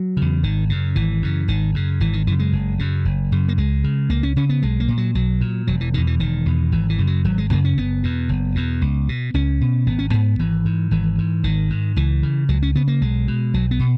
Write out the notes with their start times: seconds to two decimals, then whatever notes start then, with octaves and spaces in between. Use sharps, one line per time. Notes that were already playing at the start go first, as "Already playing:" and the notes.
Already playing: F#3
0.17 E2 C#3
0.43 G#1 D#3
0.70 F#2 C#3
0.96 G#1 E3
1.22 F#2 C#3
1.48 G#1 D#3
1.74 F#2 C#3
2.00 G#1 E3
2.13 D#3
2.27 F#2 C#3 E3
2.39 G#3
2.53 F#1
2.79 F#2 C#3
3.05 F#1
3.32 F#2 C#3
3.48 A#3
3.58 C#2 G#3
3.84 C#3
4.09 C#2 A#3
4.23 C#4
4.36 C#3 C#4
4.49 B3
4.62 B1 G#3
4.80 A#3
4.88 A#2
4.98 F#3
5.15 B1 F#3
5.41 A#2
5.67 E1 F#3
5.81 E3
5.94 E2 B2 D#3
6.07 E3
6.20 E1 D#3
6.46 E2 B2
6.72 G#1 E3
6.90 E3
6.98 F#2 C#3
7.07 F#3
7.24 G#1 F#3
7.38 G#3
7.51 F#2 C#3 A#3
7.65 C#4
7.78 F#1 B3
8.03 E2 B2
8.29 F#1
8.55 E2 B2
8.82 C#2
9.09 B2
9.34 C#2 C#4
9.61 B2
9.86 G#1 B3
9.99 C#4
10.11 G#2 B3
10.39 G#1 E3
10.65 G#2
10.91 G#1 E3
11.18 G#2
11.44 G#1 D#3
11.70 G#2
11.96 C#2 E3
12.23 C#3
12.49 C#2 F#3
12.63 C#4
12.75 C#3 B3
12.88 A#3
13.01 B1 G#3
13.28 B2
13.54 B1 F#3
13.71 B3
13.80 B2